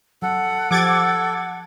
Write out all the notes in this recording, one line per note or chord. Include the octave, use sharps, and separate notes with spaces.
F#3 A4 F#5
F3 G4 A4 D6 G#6 A6